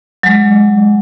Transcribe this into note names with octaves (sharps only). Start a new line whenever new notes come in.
F#3 G#3